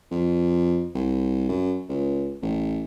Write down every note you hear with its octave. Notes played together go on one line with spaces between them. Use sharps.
F2
C2
F#2
C#2
A1